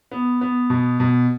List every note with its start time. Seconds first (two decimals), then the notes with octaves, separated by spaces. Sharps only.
0.11 B3
0.41 B3
0.70 B2
1.00 B2